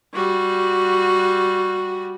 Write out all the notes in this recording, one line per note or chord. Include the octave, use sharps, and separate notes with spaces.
G3 F#4